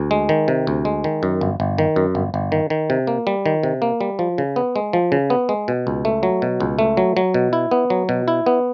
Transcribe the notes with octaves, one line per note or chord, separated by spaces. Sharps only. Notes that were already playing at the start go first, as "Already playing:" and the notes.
Already playing: D2
G#3
D#3
C3
D2
G#3
D#3
F#2
G1
G1
D#3
F#2
G1
G1
D#3
D#3
C3
A#3
G3
D#3
C3
A#3
G3
F3
C#3
B3
G#3
F3
C#3
B3
G#3
B2
C#2
A3
F#3
B2
C#2
A3
F#3
F#3
B2
E4
B3
F#3
B2
E4
B3